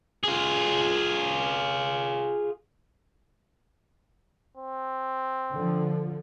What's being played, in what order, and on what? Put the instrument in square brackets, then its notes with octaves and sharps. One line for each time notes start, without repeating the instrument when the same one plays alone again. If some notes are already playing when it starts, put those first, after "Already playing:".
[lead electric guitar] F4 G#4
[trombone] C4
[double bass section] D3 F3